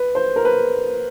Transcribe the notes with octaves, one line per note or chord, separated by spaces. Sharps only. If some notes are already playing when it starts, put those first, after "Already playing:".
Already playing: B4
C5
A#4
B4